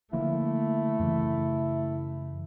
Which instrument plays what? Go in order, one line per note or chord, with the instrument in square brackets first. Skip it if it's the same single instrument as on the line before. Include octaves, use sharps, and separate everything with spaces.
[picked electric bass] D3 F3 A#3 [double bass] A3 [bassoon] E4
[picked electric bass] F#2 C#3 E3